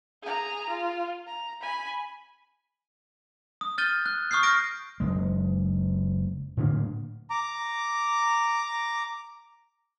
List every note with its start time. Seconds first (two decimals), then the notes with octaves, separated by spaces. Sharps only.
0.23 G#4 A#5
0.70 F4
1.27 A#5
1.61 G#5 B5
3.61 D#6
3.78 F6 G6 A6 D#7 G7
4.06 F#6
4.31 C#6 D#6 F6 G6 C7
4.43 D#6 F6 G6 A#6 D7
5.00 F#1 G#3
6.57 A2 D3 A#3
7.30 A#5 D6